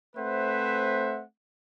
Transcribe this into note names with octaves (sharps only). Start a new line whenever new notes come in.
A3 C4 B4 C5 E5 F#5